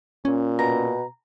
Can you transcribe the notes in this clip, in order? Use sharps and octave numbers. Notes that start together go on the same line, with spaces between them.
A#2 C#4
B2 A#5